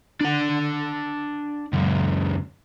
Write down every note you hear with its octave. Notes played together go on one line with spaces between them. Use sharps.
D4 F#5
C#2 F#2